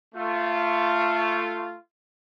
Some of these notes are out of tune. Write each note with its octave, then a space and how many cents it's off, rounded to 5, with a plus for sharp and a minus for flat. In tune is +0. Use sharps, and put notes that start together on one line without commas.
A3 +10 F4 -10